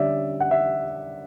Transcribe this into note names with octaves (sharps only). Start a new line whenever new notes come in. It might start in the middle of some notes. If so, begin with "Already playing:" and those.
Already playing: D3 G3 C#4 D5 E5
F#5
E5